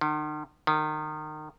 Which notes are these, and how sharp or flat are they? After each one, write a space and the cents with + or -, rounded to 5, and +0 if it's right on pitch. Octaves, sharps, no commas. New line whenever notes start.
D#3 -45
D#3 -25